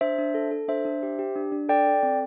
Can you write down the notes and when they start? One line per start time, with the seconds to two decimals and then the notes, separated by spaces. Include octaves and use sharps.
0.01 D4 C5 E5
0.18 D4
0.34 A4
0.51 A4
0.68 D4 C5 E5
0.85 D4
1.03 G4
1.19 G4
1.35 D4
1.52 D4
1.69 A4 D5 G5
1.87 A4
2.03 C4